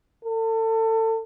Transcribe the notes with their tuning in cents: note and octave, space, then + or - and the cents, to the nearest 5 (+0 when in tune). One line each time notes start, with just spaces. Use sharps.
A4 +30